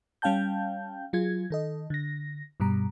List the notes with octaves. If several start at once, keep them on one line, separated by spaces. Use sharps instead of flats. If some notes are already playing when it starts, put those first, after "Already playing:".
G3 C#4 F5 G5 A5 G6
F#3 F4 G#4 G#6
D#3 A4 D#5
D3 A#6
G2 B2 G3 A#5